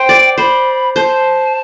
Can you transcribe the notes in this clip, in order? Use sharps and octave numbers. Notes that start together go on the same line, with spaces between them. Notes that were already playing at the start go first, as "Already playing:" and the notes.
Already playing: C5 G5
D5
C5 B5
C5 A5